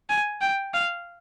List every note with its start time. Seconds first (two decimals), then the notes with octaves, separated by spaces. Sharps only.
0.10 G#5
0.42 G5
0.74 F5